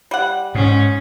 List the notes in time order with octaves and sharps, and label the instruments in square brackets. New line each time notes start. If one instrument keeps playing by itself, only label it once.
[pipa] G3 F#5
[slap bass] G#2 [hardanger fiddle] C#4